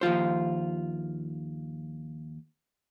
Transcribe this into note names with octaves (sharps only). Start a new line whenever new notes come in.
D#2 F3 F4 C5